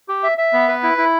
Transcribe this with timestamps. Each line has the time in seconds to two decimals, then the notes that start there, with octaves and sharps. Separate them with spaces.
0.09 G4
0.23 E5
0.38 E5
0.53 B3
0.68 B4
0.83 E4
0.98 E4